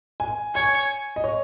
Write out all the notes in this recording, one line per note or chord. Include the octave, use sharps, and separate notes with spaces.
G#5
C#5 G#5
D#5
C#5